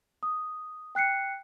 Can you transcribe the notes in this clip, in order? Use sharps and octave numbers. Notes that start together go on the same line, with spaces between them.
D#6
G5 F#6 C7 C#7